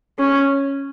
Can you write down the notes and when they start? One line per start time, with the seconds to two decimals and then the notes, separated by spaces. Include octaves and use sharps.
0.19 C#4